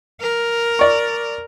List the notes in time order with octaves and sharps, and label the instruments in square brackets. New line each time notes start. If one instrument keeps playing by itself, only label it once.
[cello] A#4
[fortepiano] D5 C#6